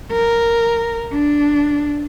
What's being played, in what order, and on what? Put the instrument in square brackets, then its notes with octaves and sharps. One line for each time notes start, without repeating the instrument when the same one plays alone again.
[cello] A#4
D4